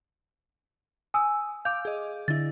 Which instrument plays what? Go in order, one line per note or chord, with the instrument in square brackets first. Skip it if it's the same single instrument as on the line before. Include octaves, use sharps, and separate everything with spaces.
[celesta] G#5 E6 [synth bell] D#6
[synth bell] F5 D6 [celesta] G6
[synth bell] G#4 D#5
[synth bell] D3 E4 [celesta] A6